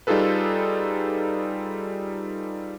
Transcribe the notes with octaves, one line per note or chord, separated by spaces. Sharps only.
G3 D#4 F4 G#4 A4 B4